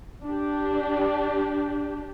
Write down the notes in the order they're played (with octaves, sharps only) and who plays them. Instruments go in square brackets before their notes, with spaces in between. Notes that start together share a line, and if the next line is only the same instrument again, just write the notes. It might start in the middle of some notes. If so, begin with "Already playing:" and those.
[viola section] D4 G4